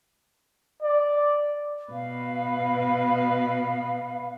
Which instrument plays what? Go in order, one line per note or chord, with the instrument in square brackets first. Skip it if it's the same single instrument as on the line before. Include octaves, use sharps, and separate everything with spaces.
[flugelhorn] D5
[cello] B2 [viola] B4 [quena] F5